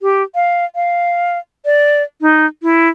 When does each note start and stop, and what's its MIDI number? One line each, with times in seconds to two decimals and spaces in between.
0.01 0.23 67
0.35 0.65 77
0.75 1.38 77
1.65 2.03 74
2.21 2.46 63
2.63 2.88 64